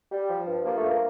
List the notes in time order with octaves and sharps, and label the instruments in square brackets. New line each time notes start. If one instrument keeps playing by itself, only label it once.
[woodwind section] G3
F3
G2
F3 A#3
A3
G2
A#3